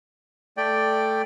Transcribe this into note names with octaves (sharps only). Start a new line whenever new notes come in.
A3 D5 G5